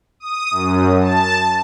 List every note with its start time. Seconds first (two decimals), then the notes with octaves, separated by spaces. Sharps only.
0.20 D#6
0.51 F#2
1.00 A5